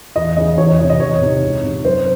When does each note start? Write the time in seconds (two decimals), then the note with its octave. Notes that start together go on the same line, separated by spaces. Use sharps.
0.16 E2 D#5
0.37 C#3 E3 D#5
0.58 E2 C#5
0.68 C#5
0.79 E3 D#5
0.82 C3
0.90 D#5
1.00 E2 C#5
1.21 C3 D#3
1.42 C#2
1.64 C3 D#3
1.85 F#2 C5